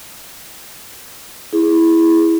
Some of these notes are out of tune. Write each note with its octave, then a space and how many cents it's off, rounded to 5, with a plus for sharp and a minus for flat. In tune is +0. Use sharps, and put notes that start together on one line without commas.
E4 +0 G#4 +0